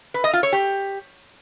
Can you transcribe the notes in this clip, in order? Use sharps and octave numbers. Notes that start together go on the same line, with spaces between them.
B4
D#5
F4
C#5
G4